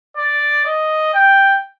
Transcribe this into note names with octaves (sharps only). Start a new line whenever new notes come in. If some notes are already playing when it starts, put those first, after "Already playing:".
D5
D#5
G5